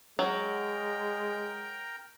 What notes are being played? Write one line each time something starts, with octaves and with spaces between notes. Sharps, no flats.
F#3 G#3 A#4 G5 A#5